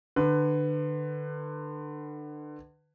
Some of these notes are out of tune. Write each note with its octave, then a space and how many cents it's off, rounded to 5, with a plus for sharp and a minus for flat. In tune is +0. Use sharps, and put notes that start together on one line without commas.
D3 +30 B4 +15